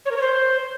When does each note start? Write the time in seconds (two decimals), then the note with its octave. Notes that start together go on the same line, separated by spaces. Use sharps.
0.05 C#5
0.11 A#4
0.16 C#5
0.21 C5